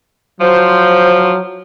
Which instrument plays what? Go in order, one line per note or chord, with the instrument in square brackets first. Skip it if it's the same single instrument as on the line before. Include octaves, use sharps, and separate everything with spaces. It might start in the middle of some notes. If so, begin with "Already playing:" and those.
[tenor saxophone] F3 [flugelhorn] F#3 [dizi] C5